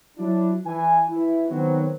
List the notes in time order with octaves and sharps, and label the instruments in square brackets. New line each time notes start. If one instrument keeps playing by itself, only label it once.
[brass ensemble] F#3 D4 E4
E3 G#5
E3 E4
D#3 F#3 B3 C4